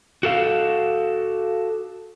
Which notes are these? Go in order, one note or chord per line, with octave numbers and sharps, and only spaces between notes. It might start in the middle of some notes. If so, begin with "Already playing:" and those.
F#4 A4 F5